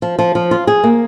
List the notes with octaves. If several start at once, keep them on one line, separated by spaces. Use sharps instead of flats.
F3
F3
F3
F4
G#4
A#3